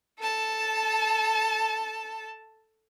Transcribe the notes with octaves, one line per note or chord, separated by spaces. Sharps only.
A4 A5